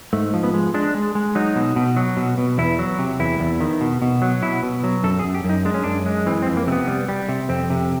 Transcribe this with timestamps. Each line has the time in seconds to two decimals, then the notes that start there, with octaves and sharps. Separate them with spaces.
0.13 G#2 A3
0.34 F3
0.43 B3
0.54 G#3
0.74 G#3 D4
0.95 G#3
1.15 G#3
1.35 F#3 D#4
1.56 B2
1.76 B2
1.97 F#3
2.17 B2
2.38 B2
2.58 E2 E4
2.79 F#3
2.99 C3
3.20 E2 E4
3.40 E2
3.61 D#3
3.81 B2
4.02 B2
4.22 F#3
4.42 B2 E4
4.63 B2
4.84 F#3
5.04 F#2 A4
5.19 G#4
5.24 F#2
5.34 G4
5.44 F#2 D#4
5.65 G#3 D4
5.74 C#4
5.84 F#2 D4
6.06 G#3
6.26 E3 C4
6.42 C4
6.47 F2
6.57 A#3
6.67 C3 C4
6.72 B3
6.88 G3
7.09 G3
7.29 C3
7.49 F2 C4
7.70 C3